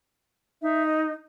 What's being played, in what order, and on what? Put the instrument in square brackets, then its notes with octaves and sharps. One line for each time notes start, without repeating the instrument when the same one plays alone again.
[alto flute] D#4 [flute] E5
[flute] D#5